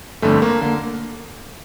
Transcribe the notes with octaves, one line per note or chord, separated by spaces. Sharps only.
G1 F2 D3 A3
A#3
D3 A#3